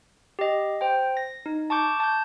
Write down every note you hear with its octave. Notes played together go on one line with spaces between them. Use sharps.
G4 D#5
C5 G5
A#6
D#4
A5 C#6 D6 G6
A5 G6